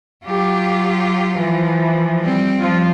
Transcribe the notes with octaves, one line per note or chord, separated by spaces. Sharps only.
F#3 F4 G4
E3 F3
G3 C4
F3 F4